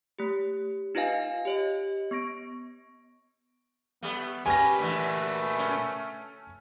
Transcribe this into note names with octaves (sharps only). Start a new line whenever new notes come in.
A3 G4
D#4 F4 B4 D#5 F5 G#5
G4 C#5 D#5
B3 C#6 A#6 D7
G3 A3 B3
A#2 G3 C#4 G4 B4 G#5 A#6
D3 E3 A3
C#4